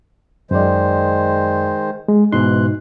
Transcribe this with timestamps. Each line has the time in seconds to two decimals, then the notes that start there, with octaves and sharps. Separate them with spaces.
0.51 F#2 D#3 G#3 C5 D5
2.08 G#3
2.33 G#2 B2 E3 D#4 C6 F#6